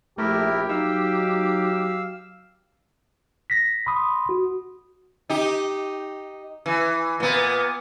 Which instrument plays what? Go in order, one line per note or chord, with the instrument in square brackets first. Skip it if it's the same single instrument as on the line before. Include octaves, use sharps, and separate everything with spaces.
[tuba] A#1 [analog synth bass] A3 [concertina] E4 A#4 [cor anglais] G4
[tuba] F#3 [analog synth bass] D#4 [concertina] F5 E6
[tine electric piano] A#6 B6
B5 C6 D#6
F#4
[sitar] D#4 G4
E3
A#2 B3